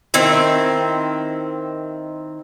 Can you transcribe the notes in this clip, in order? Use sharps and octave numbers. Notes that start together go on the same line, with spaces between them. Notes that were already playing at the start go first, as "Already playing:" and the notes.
D#3 C4 E4